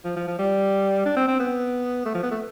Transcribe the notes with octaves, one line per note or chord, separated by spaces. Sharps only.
F3
F3
F3
G3
D4
C4
C4
B3
A3
F3
B3
A3